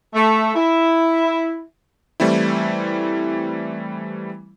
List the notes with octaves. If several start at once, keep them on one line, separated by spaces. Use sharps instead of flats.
A3
E4
E3 G3 A3 C4 E4